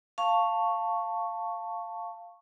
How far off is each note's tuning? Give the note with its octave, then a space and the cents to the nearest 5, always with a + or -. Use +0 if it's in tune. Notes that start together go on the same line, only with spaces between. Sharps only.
F5 +0 A5 +10 C#6 +0